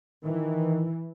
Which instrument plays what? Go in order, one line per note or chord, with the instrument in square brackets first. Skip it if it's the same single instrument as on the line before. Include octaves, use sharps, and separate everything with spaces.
[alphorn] D#3 [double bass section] E3